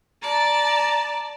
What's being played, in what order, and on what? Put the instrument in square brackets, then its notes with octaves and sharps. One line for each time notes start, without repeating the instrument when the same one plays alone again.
[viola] D5 A5 [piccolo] A#5